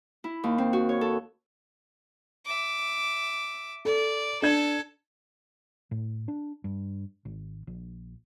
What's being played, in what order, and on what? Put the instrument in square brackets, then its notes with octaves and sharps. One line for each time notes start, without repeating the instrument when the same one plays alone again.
[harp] E4
D#2
C4
F#4
C#5
A4
[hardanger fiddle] E5 D6
[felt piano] A4 [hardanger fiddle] D5
[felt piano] D4 G#6 [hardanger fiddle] A4
[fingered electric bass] A2
D4
G2
G#1
A#1